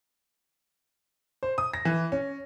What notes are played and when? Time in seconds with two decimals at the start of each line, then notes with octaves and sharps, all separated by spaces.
1.43 C5
1.58 D#6
1.74 A#6
1.85 E3
2.12 C#4